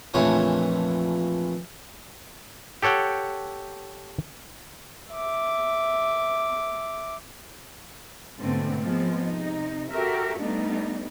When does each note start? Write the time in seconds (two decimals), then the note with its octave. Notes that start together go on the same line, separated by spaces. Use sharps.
0.14 A#1 F2 E3 A3 C#5 G#5
2.83 G4 A4 C#5 F#5 G5
5.12 E5 D6
8.40 G#2 B2 D3 A3 B3 C4
8.83 F3 G#3 B3 C4
9.25 C3 D#4
9.92 F#4 G4 A4 A#4 E5
10.38 G3 A3 B3 D4 D#4